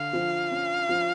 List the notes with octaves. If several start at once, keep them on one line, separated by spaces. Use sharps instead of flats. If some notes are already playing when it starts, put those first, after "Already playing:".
Already playing: D3 F5
F3
C#4
F3